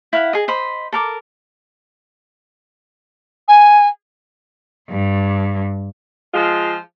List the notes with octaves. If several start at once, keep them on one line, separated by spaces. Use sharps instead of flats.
E4 F5 F#5
G#4 D#5
C5 D#5 B5
A4 A#4 D6
G#5
G2
F3 G#3 F4